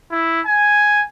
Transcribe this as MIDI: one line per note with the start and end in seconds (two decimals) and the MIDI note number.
0.11 0.40 64
0.46 1.03 80